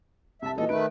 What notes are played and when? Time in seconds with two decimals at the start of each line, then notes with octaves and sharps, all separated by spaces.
0.42 C2 E5 A5
0.57 A#2 E3 F#4 A4 D#5
0.69 D#3 A3 D#4 B4 D7